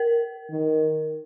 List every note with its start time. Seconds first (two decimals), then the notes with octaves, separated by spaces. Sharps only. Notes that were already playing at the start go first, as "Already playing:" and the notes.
Already playing: A#4
0.50 D#3